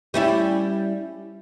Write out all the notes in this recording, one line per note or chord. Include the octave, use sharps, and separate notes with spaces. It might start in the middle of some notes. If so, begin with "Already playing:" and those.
G3 C#4 E4